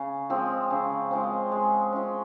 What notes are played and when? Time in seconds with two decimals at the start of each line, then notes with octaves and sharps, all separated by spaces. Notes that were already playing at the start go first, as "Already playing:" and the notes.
Already playing: C#3
0.30 F3 G#3 C4
0.70 C#3
1.11 F3 G#3 C4
1.52 G#3
1.93 C#4 F4